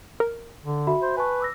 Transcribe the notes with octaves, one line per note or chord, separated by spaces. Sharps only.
A#4
D3
F#4 E5 B5
C5
B4 G#5 A5 C#6
D6 E6 A#6